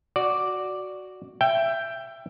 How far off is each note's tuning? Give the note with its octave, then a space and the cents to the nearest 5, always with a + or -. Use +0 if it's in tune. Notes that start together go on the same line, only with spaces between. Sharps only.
F#4 +0 D5 +0
E5 +20 G5 +0